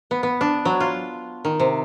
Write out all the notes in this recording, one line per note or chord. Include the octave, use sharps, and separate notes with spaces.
B3
B3
D4
F#3
F4
D#3
C3